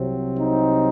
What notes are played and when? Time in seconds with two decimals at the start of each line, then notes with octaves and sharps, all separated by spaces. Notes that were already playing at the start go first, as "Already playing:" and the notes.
Already playing: C2 C3 F#3 C4
0.38 D#4